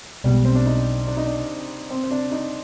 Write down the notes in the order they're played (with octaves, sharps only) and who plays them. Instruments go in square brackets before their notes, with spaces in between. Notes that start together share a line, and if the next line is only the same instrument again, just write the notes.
[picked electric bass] B1 B2 G#3 B3 [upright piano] G3
[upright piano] C4
D4
D#4
D4
D#4
D4
C4
C4
D4
D#4